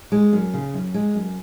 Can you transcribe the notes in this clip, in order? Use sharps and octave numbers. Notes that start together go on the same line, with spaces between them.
G#3
F#2
C#3
F#2
G#3
F#2